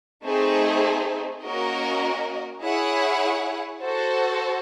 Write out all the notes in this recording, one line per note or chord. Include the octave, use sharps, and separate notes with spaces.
A3 C4 D#4 G#4 C5
A#3 C#4 F#4 A#4 D#5
E4 G#4 C#5 F#5
F#4 A4 C5